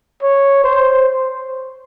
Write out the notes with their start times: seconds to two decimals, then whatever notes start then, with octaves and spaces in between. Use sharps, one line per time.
0.22 C#5
0.64 C5